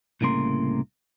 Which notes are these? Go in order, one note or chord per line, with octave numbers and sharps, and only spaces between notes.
C2 A2 C#3 A#3 C6